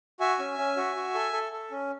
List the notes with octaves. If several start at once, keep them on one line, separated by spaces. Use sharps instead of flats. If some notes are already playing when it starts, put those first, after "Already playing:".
F#4 E5 G#5
C#4
C#4
F#4
F#4
A4
A4
A4
C#4